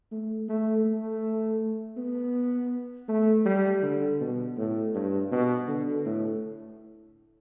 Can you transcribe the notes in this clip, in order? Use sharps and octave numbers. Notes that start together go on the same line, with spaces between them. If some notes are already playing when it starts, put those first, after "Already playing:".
A3
A3
A3
B3
A3
G3
D3
B2
A2
G2
B2
D3
A2